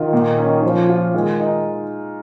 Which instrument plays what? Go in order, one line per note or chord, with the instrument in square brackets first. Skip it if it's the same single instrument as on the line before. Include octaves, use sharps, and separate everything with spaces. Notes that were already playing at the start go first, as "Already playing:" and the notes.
Already playing: [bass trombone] D#3 [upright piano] F4
[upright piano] A#2
C#4
[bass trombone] F3 [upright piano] F4
[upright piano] F4
[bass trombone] D#3 [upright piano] G#3
[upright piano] D#4